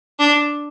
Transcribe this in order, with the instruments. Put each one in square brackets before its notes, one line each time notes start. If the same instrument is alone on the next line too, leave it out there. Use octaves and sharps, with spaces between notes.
[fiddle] D4